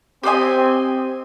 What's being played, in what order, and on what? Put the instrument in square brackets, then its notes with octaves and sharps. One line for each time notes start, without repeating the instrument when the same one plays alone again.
[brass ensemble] C4 [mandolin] G4 C5 D#5 G#5